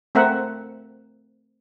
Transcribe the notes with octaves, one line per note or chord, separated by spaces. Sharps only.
A3 C4 A#4 E5 F#5